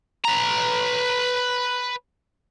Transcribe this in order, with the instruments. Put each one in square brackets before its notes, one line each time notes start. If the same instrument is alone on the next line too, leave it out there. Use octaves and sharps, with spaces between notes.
[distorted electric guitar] B4 A#5